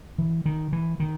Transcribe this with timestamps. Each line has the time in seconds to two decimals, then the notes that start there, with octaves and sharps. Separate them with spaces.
0.18 E3
0.46 D#3
0.73 E3
1.00 D#3